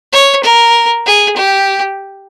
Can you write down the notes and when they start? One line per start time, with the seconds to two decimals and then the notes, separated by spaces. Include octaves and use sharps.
0.12 C#5
0.43 A#4
1.06 G#4
1.36 G4